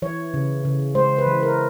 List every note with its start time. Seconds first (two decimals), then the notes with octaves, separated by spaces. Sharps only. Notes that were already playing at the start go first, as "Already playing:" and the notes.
0.02 E3 C#5
0.34 C#3
0.65 C#3
0.95 G#3 C5
1.18 B4
1.27 E3
1.43 A#4